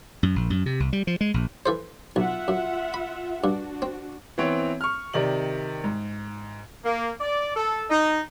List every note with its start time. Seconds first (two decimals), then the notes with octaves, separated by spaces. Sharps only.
0.23 F#2
0.36 A#1
0.50 F#2
0.66 C3
0.80 C2
0.93 G3
1.07 F3
1.21 G#3
1.34 A#1
1.66 E3 A4 C5
2.16 B1 F4 E5 F#5
2.48 F#2
2.94 B5
3.44 G2 D4 F#4
3.82 C4
4.38 E3 B3 C4 C#5
4.81 C#6 F6
5.13 C3 D#3 D5 F#7
5.84 G#2
6.83 A#3
7.20 D5
7.53 A4
7.89 D#4